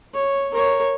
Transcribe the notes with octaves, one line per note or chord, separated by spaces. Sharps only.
C#5
A#4 C#5